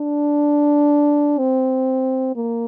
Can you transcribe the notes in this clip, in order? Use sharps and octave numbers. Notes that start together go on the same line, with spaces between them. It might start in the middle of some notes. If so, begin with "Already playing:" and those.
Already playing: D4
C4
A#3